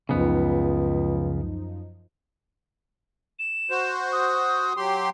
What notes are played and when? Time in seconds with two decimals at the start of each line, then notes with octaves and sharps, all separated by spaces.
0.09 C#2 F#2 C#3 F3 B3 D#4
3.39 E7
3.71 F#4 C5
4.12 D#6
4.77 F#3 G4 C6